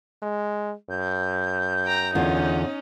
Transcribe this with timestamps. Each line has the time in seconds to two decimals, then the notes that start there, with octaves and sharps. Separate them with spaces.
0.23 G#3
0.90 F#2 G6
1.85 G5 A#5
2.15 E2 D3 C#4 D#4 F4